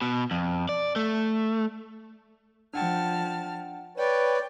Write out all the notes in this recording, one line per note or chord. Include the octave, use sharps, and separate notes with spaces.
B2
F2
D5
A3
F3 D4 F#5 G5 A5 F6
B4 C#5 D5 G5